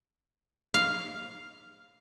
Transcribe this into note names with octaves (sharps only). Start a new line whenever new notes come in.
F5